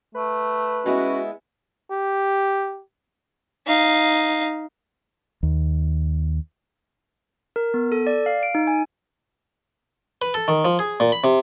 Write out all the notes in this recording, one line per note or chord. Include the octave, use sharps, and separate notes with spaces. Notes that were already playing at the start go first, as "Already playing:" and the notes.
A3 B4
G#3 B3 C#4 E4 F#4
G4
D#4 F5
D#2
A#4
B3
A4
D5
F5
D7
D#4
G#5
B4
A4
D#3
F3
G#4
A#2
B5
C3